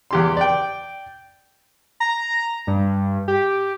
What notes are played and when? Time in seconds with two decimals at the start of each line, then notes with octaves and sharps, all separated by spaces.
0.11 E2 G4 C6
0.37 D5 G5
2.00 A#5
2.67 G2
3.28 G4